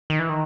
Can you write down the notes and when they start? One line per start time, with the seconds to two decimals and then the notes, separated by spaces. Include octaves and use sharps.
0.10 D#3
0.19 E3
0.29 D#3